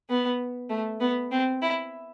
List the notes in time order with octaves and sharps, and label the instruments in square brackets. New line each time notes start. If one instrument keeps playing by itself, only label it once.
[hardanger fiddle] B3
A3
B3
C4
E4